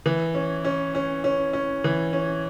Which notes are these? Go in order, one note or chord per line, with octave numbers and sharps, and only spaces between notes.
E3
C#4
C#4
C#4
C#4
C#4
E3
C#4